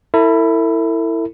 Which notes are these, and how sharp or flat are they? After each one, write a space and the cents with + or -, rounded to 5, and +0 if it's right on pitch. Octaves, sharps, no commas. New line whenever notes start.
E4 +0 A4 +45